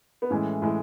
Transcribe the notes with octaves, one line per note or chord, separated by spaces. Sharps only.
B3
A2 E3 G#3 C#4
A2 E3 G#3